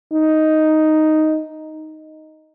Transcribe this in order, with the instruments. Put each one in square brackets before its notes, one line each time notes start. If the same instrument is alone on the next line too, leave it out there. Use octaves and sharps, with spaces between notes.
[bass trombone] D#4